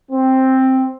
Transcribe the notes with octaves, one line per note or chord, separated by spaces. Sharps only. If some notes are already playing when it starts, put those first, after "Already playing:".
C4